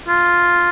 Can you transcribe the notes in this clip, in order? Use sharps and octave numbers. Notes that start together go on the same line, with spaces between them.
F4